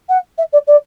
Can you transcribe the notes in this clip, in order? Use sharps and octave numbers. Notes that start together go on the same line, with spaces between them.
F#5
E5
D5
D5